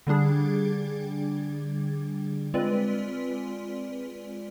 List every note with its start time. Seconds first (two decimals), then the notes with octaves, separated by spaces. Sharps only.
0.07 D3 G3 D4 G#4
2.54 G#3 C4 F4 B4 D5